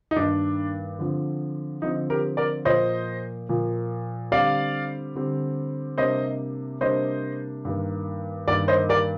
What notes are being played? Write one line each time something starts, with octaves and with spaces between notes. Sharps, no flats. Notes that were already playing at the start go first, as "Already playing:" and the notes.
D#4
G2 D#3 A#3 D4
D3 F3 C4
D3 F3 C4 D#4
G4 A#4
A#4 D5
A#2 F3 A#3 C5 D#5
A#2 F3 A#3
D3 G3 C4 D5 F5
D3 G3 C4
C3 G3 A#3 D4 C5 D#5
C3 G3 A#3 D4 C5 D#5
G2 D#3 A#3
G2 D#3 A#3 A#4 D5
C5 D#5
A#4 D5